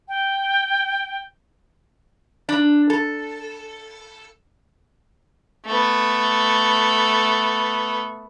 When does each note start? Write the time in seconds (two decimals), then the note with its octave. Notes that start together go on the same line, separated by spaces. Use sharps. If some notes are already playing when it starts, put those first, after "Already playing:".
0.08 G5
2.49 D4
2.90 A4
5.66 A3 B3